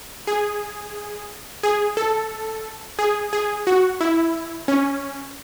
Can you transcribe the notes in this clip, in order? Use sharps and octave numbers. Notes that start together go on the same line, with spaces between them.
G#4
G#4
A4
G#4
G#4
F#4
E4
C#4